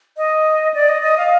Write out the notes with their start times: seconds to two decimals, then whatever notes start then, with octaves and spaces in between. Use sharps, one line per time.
0.17 D#5
0.74 D5
0.89 D#5
1.02 D#5
1.18 F5